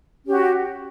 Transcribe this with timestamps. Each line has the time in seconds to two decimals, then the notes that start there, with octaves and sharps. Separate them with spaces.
0.25 C#4
0.28 G4
0.31 F#4